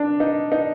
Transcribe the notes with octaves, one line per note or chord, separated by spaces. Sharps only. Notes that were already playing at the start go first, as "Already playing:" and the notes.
Already playing: D4
D#4
D#4